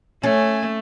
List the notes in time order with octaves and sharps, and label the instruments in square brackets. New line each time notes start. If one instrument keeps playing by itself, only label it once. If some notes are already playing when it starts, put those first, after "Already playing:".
[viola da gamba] A3 [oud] C#4 [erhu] G#5